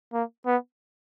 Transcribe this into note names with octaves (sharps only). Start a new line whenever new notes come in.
A#3
B3